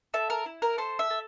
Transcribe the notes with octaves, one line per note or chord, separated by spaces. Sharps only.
A4 E5
A#4
E4
A#4
A4 C5
E5
A4